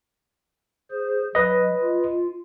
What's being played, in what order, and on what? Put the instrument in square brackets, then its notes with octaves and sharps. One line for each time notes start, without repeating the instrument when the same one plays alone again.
[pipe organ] G#4 C5
[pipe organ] F#3 [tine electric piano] B4 D#5
[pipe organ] F4